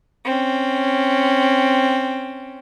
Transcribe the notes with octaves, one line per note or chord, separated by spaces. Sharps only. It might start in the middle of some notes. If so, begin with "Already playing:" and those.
C4 C#4